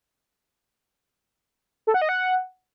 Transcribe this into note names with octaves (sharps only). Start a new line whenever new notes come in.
A4
F#5
D#5
F#5